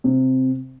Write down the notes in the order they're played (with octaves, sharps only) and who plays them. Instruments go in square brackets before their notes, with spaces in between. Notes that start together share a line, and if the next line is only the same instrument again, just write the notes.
[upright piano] C3